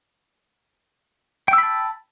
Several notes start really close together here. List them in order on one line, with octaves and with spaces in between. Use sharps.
G5 E6 B5 A5